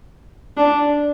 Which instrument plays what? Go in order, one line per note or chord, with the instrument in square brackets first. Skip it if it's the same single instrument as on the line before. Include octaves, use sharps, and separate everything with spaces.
[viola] D4